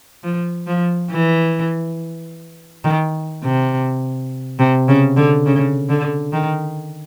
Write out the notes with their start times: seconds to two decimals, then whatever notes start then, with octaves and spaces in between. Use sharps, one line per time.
0.23 F3
0.67 F3
1.10 E3
2.84 D#3
3.43 C3
4.59 C3
4.88 C#3
5.17 D3
5.46 C#3
5.89 D3
6.33 D#3